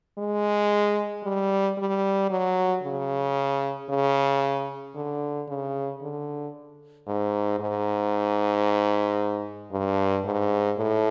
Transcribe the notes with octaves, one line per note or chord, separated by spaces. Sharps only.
G#3
G3
G3
F#3
C#3
C#3
D3
C#3
D3
G#2
G#2
G2
G#2
A2